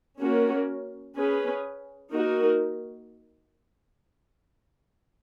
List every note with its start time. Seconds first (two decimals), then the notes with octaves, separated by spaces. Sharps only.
0.19 A#3 C#4 F#4 A#4
1.15 C#4 G#4 B4
2.12 A#3 D#4 F#4 A#4